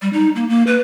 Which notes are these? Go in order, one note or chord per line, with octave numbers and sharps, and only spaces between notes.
G3
D#4
A#3
A#3
B4